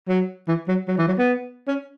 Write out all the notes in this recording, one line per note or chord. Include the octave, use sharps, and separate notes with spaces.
F#3
E3
F#3
F#3
E3
F#3
B3
C#4